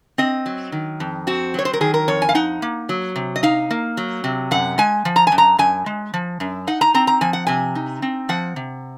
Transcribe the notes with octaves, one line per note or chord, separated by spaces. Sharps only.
C4 D#5
F#3
D#3
F2
C4 F#4
F#3 C#5
C5
A#4
D#3 G#4
A#4
F2 C#5
G#5
F5
D#4 F#5
A#3
F#3
C3
D#5
D#4 F5
A#3
F#3
C3
F#2 F#5
G#3 G#5
F3
A#5
G#5
F#2
A#5
F#2 G#5
G#3
F3
F#2
D#4 F#5
A#5
C4 A#5
A#5
F3 G#5
F#5
C3 G#5
D#4
C4
F3 F#5
C3